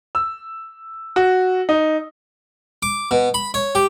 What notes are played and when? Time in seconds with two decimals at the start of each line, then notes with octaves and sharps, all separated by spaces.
0.15 E6
1.16 F#4
1.69 D#4
2.83 D6
3.11 B2
3.34 B5
3.54 C#5
3.75 G4